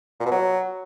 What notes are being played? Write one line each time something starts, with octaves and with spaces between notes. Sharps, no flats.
A#2
B2
F#3